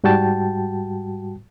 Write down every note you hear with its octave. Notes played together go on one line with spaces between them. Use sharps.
G#2 G3 F#4 G5 A5